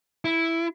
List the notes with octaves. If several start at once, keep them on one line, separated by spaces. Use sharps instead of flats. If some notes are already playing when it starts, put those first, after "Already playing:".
E4